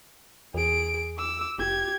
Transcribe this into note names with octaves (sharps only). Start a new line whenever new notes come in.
E2 G#4 D7
D6 E6
F1 G4 G#6